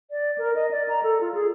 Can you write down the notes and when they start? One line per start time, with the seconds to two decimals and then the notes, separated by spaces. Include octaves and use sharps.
0.11 D5
0.38 A#4
0.55 D#5
0.71 D5
0.89 A#5
1.03 A4
1.21 F4
1.34 G#4